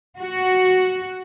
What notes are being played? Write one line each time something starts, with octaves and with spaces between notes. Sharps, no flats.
F#4